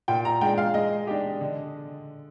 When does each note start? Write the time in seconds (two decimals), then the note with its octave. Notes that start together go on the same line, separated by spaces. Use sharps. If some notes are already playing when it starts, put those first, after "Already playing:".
0.08 A#2 G5
0.25 A#5
0.41 G#3 D4 G5
0.58 F5
0.74 G#3 D#5
1.07 D4 G4
1.41 D3